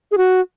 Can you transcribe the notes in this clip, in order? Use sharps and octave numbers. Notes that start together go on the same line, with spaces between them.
G#4
F#4